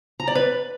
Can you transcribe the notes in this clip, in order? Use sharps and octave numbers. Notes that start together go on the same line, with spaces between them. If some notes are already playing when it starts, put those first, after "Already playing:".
A#5
D5
B4